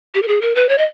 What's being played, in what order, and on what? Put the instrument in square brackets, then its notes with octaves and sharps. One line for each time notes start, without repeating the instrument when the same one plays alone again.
[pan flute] G4
A#4
G#4
A#4
B4
C#5
D#5